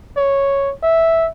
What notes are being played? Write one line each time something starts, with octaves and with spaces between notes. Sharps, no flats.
C#5
E5